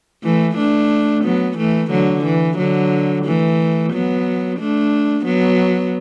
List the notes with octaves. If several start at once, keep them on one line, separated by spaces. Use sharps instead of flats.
E3 A3
A3 D4
F#3 B3
E3 A3
D3 F#3
E3
D3 F#3
E3 A3
F#3 B3
A3 D4
F#3 B3